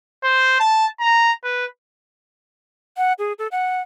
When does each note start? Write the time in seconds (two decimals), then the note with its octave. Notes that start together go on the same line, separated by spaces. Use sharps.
0.24 C5
0.59 A5
1.00 A#5
1.44 B4
2.97 F#5
3.19 G#4
3.39 A4
3.52 F#5